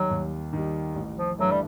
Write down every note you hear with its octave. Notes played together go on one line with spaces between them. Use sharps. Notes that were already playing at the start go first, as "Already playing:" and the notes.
Already playing: D#2 D#3 F#3 G3
D#2
D#3 G3
A1
F3
G2 E3 F#3 A3
G3